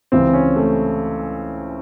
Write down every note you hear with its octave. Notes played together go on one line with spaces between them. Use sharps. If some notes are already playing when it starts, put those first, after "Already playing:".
C#2 C3 E3 C4
C#4
A3